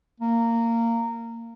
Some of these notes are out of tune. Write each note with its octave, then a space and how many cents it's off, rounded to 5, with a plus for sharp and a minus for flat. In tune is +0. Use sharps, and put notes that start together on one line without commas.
A#3 -15